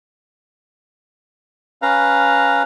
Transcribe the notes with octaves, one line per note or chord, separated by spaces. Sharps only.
C#4 B4 F5 A#5